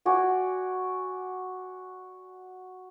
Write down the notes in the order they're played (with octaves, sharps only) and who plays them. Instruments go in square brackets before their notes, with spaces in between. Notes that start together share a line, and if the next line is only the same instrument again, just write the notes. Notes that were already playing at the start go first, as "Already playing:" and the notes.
[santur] F#4 D5 G#5